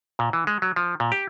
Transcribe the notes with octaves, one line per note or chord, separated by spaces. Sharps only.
A#2
E3
G#3
F#3
F3
A#2
G4